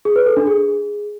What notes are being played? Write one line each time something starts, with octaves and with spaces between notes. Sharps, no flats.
G#4
B4
A4
D4
G#4